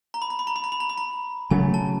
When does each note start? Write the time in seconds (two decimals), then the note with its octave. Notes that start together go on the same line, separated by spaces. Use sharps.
0.14 A#5
0.22 B5
0.30 A#5
0.39 B5
0.47 A#5
0.56 B5
0.64 A#5
0.72 B5
0.80 A#5
0.89 B5
0.98 A#5
1.51 C#3 F#3 A3 G#5
1.74 A5